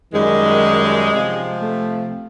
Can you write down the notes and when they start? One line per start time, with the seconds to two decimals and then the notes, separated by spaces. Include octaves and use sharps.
0.13 F#2 D#3 G3 G#3
1.11 C3 F3
1.59 A3